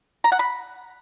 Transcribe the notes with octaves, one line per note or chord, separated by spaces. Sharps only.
A#5
F#5
B5